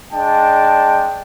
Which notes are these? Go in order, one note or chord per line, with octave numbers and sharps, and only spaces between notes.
G#3 D4 G5 A5